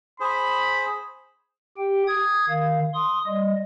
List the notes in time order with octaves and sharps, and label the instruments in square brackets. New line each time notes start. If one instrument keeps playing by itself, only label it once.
[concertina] G#4 C5 [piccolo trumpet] B5
[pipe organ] G4 G5
D#6 G#6
D#3 F5
C6 D#6
G3 D#5